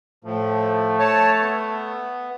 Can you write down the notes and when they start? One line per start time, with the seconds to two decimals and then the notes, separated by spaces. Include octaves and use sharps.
0.24 A2 F3 A3
0.99 C#5 A5
1.41 B3